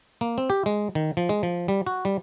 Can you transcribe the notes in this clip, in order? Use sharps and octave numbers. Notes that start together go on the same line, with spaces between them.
A#3
C4
G4
G#3
D#3
F3
G#3
F3
G3
F#4
G3